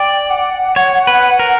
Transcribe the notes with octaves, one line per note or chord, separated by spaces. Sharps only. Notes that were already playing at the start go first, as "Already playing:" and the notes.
Already playing: D5 G5
F#5
C#5
B4
A#4